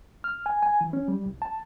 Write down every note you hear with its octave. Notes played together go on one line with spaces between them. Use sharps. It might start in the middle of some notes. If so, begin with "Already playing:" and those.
F6
G#5
G#5
E3
C#4
G3
C2
A5